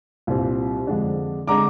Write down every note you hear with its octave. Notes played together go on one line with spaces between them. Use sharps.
C2 A#2 G3 C4
F2 D3 G#3 D4
D3 G#3 D4 A#5 D6